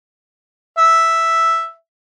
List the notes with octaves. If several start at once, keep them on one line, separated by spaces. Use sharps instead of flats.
E5